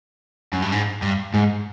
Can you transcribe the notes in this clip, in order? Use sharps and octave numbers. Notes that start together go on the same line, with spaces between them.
F#2
G2
G#2
G2
G#2